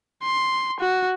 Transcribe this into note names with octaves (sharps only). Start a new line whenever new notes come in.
C6
F#4